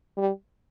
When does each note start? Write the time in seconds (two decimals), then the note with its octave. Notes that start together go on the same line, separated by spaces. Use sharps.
0.17 G3